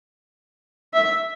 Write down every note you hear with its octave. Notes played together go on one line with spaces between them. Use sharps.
E5